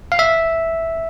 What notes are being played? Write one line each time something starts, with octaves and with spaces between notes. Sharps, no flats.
F5
E5